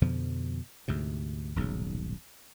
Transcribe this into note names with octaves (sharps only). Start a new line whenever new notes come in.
F2 B2 D3 F3
D2 G#2 C3
D#1 B1 G#2 C#3